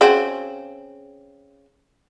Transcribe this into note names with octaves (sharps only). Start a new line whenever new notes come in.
C#3 C4 F#4